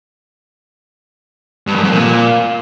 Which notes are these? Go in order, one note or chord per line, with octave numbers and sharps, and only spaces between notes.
G2
F#2
F2
A#2